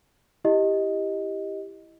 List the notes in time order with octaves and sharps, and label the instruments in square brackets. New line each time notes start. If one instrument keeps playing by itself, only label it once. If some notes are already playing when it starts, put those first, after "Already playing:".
[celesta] E4 G4 D#5